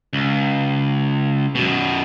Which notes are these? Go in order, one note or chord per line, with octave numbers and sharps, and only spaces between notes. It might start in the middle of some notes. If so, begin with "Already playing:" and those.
C#2
F#2 B2